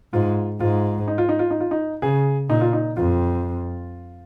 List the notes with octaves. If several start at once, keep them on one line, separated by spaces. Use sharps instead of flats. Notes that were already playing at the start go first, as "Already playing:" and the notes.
G#2 F4
G#2 F4
D#4
F4
D#4
F4
D#4
F4
D#4
C#3 G#4
A#2 D#4
F4
D#4
F2 F4